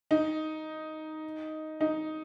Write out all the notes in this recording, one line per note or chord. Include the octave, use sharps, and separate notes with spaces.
D#4
D#4